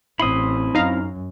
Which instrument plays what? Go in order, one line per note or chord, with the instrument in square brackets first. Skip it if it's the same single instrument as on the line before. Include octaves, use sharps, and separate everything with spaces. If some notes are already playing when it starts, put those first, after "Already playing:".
[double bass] A1 [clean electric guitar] C4 E4 [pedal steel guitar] B5 C6 D#6
[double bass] F#2 [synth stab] D#4 F5 A#5